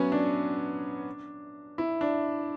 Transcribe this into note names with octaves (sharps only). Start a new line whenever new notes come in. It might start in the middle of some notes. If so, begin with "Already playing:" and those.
Already playing: F#3 B3 C#4
D4
E4
D4